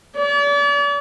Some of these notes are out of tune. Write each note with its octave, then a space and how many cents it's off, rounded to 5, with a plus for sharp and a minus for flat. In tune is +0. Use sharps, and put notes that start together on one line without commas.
D5 -40